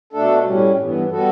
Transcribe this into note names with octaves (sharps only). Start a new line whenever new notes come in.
B2 A3 D4 A4
A2 G3 C#4
G2 E3 B3
G3 B3 F#4 A4